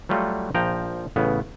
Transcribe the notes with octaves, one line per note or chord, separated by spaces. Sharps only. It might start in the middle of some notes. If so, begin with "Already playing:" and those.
F#3 G3 A3 F4 F#4
A#1 F3 G5 A#5
A1 C#3 B3